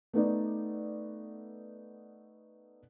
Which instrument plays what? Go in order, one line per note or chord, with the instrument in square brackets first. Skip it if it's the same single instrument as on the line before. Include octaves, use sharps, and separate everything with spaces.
[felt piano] A3 B3 D#4 D5